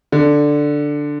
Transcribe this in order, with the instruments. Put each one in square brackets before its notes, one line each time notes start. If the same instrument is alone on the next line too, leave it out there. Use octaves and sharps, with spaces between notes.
[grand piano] D3